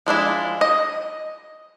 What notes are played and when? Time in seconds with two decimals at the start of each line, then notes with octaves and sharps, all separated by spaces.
0.06 F3 G#3 D4 E4
0.61 D#5